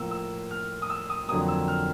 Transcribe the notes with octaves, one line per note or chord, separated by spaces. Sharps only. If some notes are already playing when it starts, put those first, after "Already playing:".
Already playing: A2 F3 A#3 E6
E6
F6
D#6
E6
D#6
F2 D3 F#3 A#3 D#6
E6
F6